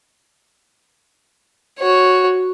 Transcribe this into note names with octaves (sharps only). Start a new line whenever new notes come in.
F#4 C#5